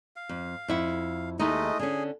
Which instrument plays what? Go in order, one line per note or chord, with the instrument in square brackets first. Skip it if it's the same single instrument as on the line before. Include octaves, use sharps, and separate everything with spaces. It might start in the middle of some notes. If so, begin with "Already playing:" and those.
[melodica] F5
[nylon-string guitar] F2
F2 E4 F#5
[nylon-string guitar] D#2 D#4 [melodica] G#3 A3 D#5
[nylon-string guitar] D3 C#4 [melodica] G#4